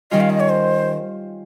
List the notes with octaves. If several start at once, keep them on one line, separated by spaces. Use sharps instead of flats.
D#3 G3 C#4 F4 D#5
F5
D#5
C#5
C5